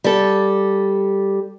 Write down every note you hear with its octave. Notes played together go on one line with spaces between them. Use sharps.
G3 A4